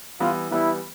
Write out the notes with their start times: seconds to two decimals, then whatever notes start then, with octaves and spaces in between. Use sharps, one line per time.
0.20 E3 G3 B3 F4
0.51 E3 G3 B3 E4